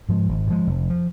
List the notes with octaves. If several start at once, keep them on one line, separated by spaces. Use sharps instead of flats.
G#2 F3 G#3
G#1
G#2
F3 G#3
F1
F3